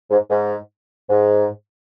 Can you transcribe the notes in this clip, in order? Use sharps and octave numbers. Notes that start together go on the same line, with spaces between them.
G#2
G#2
G#2